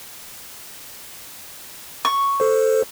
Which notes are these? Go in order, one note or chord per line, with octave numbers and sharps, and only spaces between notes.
C#6
A4 C5